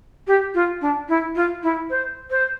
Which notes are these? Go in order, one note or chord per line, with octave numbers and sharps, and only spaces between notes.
G4
F4
D4
E4
F4
E4
C5
C5